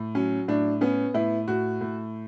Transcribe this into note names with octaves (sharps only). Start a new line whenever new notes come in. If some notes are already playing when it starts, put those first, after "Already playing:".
Already playing: A2
F#3 C#4
A2 D4
B3 C#4
A2 E4
A2 F#4
A2